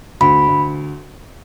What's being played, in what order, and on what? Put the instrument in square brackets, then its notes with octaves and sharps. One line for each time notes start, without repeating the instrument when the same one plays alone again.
[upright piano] D2 [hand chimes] B5
[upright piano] D2